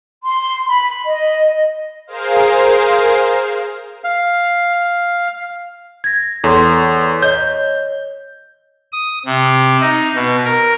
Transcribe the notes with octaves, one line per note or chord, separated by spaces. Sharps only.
C6
B5
D#5
G#4 A#4 C5 F5
F5
G#6 A#6
E2 A4 C#5 C6
C#5 D#5 G6
D#6
C3
D#4
B2
A#4